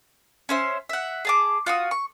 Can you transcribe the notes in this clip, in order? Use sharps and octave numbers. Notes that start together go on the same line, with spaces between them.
C#4 C5 E5
E5 F#5
G#4 A5 D6
F4 F#4 D#6
C#6